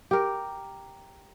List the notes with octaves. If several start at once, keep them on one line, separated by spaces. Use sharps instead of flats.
G4 A#4